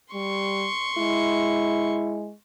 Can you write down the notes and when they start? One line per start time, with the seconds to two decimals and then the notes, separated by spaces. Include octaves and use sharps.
0.14 G3 C6 C#6
0.98 G#3 E4